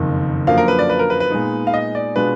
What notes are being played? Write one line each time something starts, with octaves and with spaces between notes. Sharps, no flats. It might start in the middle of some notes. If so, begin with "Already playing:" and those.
Already playing: F#1 F2 D#3
F#2 D3 F3 A#3 F5
A#4
B4
D5
B4
A#4
B4
B4
A#2 G#3 B3 D#4
F5
D#5
D5
B2 G#3 D4 F4 B4